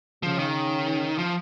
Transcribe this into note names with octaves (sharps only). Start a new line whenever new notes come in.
C#3 F3
D#3
F3